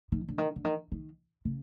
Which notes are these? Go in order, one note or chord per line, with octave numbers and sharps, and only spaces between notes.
D#3
D3
D#3
D3
D#3
D#3
C#3